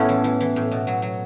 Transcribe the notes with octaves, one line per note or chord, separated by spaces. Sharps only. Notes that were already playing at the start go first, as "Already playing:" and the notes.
Already playing: A2 A3 B3 C#4 E4
E3
E3
E3
A2
B2
F#3
F#3